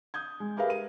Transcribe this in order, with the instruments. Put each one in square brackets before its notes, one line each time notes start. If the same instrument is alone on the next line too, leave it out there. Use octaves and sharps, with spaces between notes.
[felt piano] D#6 G6 G#6
G#3
G4 G#4 A#4 B4 E5 F5
D#7